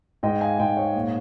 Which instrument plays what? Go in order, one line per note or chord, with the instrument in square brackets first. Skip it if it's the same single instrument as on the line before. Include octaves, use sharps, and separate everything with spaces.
[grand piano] G#2 D#5 G5
F5 G#5
G#2 D#5 G5
C#5 F5
A#2